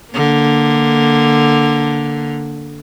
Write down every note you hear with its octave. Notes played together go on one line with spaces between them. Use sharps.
D3 A#3